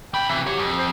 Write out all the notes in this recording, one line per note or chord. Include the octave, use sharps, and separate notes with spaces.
E2 G5 B5
C3 E3 E5
F#4 G4 C#5
F2
C5